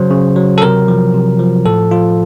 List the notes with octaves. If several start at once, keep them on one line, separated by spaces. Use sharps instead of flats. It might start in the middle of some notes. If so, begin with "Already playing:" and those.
Already playing: C#3 F#3 C5
C#3
F#3
A4
C3 A#4
F3
C3
F3
A2 A4
F3 F4